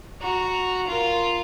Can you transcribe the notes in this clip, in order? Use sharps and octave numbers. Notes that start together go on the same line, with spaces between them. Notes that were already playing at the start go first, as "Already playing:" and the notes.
F#4 A#5
F4 A#4